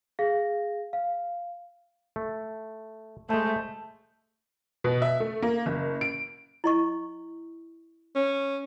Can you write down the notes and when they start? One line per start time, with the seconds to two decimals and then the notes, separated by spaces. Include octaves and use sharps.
0.19 G#4 F5 A#6
0.93 F5
2.16 A3
3.29 G#3 A3 C5 E5 A5 G6
4.84 B2
5.02 E5
5.20 A3
5.42 A#3
5.66 F#1
6.01 D7
6.64 E4 D#5 C#6
8.15 C#4